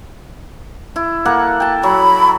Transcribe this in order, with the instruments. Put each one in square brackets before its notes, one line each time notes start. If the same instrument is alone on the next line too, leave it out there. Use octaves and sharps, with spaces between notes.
[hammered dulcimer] E4
A#3 A4 F#5
G5 A5
[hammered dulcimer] F#3 [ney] B5